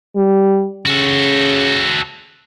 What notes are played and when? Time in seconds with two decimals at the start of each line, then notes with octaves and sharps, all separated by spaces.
0.16 G3
0.86 C#3 F#4 A4